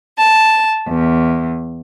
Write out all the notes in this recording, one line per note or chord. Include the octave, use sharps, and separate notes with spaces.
A5
E2